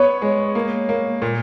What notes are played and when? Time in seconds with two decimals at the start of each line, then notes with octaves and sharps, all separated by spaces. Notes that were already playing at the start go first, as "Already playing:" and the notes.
Already playing: B3 C#5
0.22 G#3
0.55 A#3
0.89 A#3
1.22 A#2